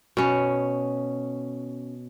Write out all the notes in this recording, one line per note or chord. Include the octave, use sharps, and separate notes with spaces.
B2 C#4